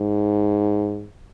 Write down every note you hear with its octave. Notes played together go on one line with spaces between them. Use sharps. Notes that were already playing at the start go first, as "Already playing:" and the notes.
Already playing: G#2